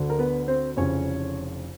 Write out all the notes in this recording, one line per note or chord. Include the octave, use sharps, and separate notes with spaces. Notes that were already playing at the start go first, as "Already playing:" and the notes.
Already playing: D2 D3
A#4
B3 B4
C4 C5
F1 F2 C#3 E3 C#4 C#5